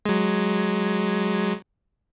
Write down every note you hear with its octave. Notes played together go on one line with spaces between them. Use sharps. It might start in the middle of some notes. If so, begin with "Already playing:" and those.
F#3 G#3